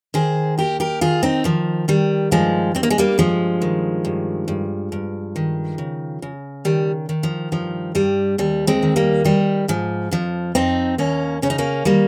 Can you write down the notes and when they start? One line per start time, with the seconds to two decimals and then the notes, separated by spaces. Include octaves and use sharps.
0.14 D#3 G#4 C5
0.58 D#2 G4 A#4
0.80 G4 A#4
1.01 D#3 F4 G#4
1.23 C4 D#4
1.44 D#3 F3
1.88 D#3 G3
2.31 G2 F3 G#3
2.75 G2 C4
2.83 A#3
2.90 G#3
2.98 G3 A#3
3.18 G2 F3 G#3
3.62 D#3
4.05 G2
4.48 G2
4.92 G2
5.36 D#3
5.78 C#3
6.22 C#3
6.65 D#3 G3
7.09 D#3
7.23 F3
7.52 G2 F3
7.95 G2 G3
8.38 D#2 G3
8.67 G#3 C4
8.83 D#3
8.96 G3 A#3
9.25 D#3 G3
9.68 G#2 F3
10.11 F2 F3
10.55 F2 C4 D#4
10.98 D#2 A#3 C#4
11.42 C#3 C#4
11.50 D#4
11.58 A#3 C#4
11.85 D#3 G3 A#3